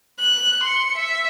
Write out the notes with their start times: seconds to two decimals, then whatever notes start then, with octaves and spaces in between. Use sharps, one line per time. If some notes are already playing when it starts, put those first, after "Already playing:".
0.19 F#6
0.63 C6 C#7
0.97 E5